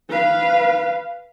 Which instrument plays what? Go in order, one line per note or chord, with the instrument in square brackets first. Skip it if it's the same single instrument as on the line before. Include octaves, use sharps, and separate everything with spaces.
[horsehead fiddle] B4 F5